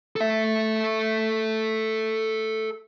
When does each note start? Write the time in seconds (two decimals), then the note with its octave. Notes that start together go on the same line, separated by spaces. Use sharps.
0.16 A4 E5